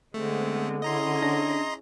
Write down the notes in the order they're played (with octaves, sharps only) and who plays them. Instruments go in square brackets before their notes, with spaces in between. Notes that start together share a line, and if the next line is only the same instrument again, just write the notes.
[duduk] D3 [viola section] G#3 B3 C4 [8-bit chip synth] A3
[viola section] C#4 E4 G#4 [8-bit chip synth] D#5 A#5 C6
[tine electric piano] D4 A#6